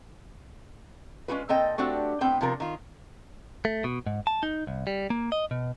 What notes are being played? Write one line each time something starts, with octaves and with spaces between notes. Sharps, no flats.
G#3 C#4 F4 F#4 B4
A#2 C4 A4 D#5 G5
A3 C4 D4 F#4 G4
A2 B3 C4 G5
C3 F3 B3 F4 A#4
D#3 F4
A3
B2
G#2
A5
D#4
C2
G3
A#3
D#5
B2